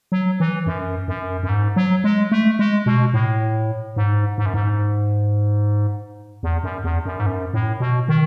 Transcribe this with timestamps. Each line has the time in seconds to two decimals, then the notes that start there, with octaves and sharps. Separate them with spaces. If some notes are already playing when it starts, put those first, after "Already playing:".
0.12 F#3
0.40 E3
0.67 F#2
1.08 F#2
1.43 F#2
1.49 G#2
1.76 F#3
2.04 G#3
2.32 A3
2.59 G#3
2.86 B2
3.13 A2
3.96 G#2
4.38 G#2
4.46 F#2
4.54 G#2
6.43 E2
6.64 F#2
6.84 E2
7.06 F#2
7.20 G#2
7.26 F#2
7.54 A2
7.80 B2
8.08 D#3